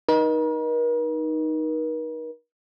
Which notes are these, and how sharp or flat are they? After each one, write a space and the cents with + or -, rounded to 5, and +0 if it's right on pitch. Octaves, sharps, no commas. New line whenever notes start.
D#4 +0 A#4 +45